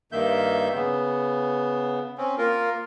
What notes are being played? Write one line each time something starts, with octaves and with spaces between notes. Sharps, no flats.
G2 D#3 A#3 E5 G6
C#3 B3
C4 C#4
A#3 F4 A#4